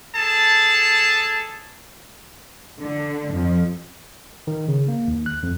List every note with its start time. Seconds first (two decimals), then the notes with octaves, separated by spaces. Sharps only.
0.16 G#4 A4 A5
2.78 D3
3.34 F2
4.47 D#3
4.68 C#3
4.88 A#3
5.08 D#2
5.26 F#6
5.43 F2